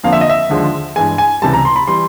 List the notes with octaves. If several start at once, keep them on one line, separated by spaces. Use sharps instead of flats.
F2 D3 F3 A#3 F5
E5
D#5
E5
D#2 D3 F3 G#3
G2 E3 G#3 G#5
G#5
C#2 C3 E3 G3 A5
A#5
C6
B5
E3 G3 C6